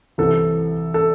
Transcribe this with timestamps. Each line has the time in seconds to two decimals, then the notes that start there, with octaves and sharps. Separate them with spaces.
0.18 C2 C3 E3 A4
0.94 A4